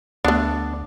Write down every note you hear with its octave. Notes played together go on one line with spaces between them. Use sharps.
D2 A3 B3 D4